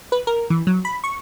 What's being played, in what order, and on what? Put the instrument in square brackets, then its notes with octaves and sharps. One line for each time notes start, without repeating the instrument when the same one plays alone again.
[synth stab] B4
A#4
E3
F#3
B5
C#6